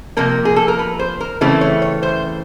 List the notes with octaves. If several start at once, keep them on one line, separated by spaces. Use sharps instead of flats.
C3 F3 A#3 A#4
G#4
A4
A#4
B4
C5
A#4
C#3 E3 A3 C4
C#5
C#5
C5